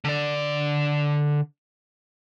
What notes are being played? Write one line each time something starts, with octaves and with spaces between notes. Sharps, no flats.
D3 D5